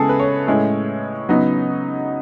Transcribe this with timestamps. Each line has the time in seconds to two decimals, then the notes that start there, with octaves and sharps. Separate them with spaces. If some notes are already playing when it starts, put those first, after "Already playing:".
Already playing: C#3 G#3 B3 E4 G#4 A4
0.09 B4
0.20 C#5
0.47 A2 G#3 C#4 E4
1.29 C#3 F#3 B3 D#4